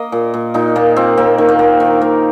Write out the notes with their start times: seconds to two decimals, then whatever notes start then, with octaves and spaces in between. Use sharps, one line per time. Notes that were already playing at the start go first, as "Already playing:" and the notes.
Already playing: A#3 D#5
0.12 A#2
0.34 A#2
0.54 A#2 D#4
0.76 A#2 A#3
0.96 A#2 C4
1.17 A#3 C4
1.38 D#3
1.49 A#3
1.59 A#3
1.80 D#3
2.01 A#3